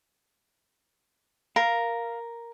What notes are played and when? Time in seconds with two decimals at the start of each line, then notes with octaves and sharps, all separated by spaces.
1.56 A#4 F5